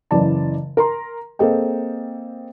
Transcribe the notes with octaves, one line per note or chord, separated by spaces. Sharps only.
F#1 C#3 E3 D5 A5
A#4 A#5 C6
A#3 C4 G#4 A4 D#5 G5